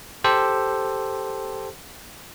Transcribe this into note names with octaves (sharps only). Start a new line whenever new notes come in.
G4 A4 C5